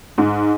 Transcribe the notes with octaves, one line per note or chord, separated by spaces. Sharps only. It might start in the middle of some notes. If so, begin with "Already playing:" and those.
G#2 G#3